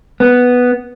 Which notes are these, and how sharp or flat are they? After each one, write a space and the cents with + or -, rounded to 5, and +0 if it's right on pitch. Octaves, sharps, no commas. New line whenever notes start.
B3 +0